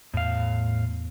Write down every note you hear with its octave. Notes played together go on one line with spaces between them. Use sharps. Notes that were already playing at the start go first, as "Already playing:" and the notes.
E2 A2 F5